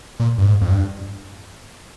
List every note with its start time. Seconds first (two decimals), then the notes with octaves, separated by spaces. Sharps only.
0.20 A#2
0.38 G2
0.45 G#2
0.61 F2
0.71 G2